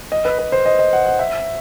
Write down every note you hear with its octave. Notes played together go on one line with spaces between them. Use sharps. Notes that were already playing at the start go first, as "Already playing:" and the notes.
D#5
B4
B4
C5
D#5
D#5
F#5
F#5
E5